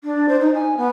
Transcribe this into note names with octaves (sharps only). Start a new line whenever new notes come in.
D4
C5
D#4
G#5
B3